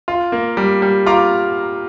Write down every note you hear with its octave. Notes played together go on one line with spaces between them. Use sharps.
F4
A#3
G3
G3
F4 A#5 D6